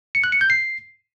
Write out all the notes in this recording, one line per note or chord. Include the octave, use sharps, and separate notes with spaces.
C#7
F#6
C#7
G6
C7